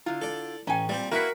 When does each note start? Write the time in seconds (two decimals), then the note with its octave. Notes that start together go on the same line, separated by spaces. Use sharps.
0.06 D3 E4 F4
0.22 A4 D5
0.67 A1 C#4 G5 G#5 A#5
0.89 A#2 G3 C4 C5
1.12 A#3 E4 F#4 A#4 B4 E5 F#5 B6